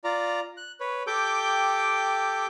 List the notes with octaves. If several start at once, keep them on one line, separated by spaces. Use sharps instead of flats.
F4 D5 A#5
F#6
B4 C#5
G4 A4 G5 D6 G6